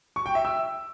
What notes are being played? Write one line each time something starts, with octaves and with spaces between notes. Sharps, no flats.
C#6
G5
E5
E6